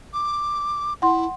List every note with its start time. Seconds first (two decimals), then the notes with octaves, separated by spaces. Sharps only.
0.13 D6
1.02 E4 F#5 C6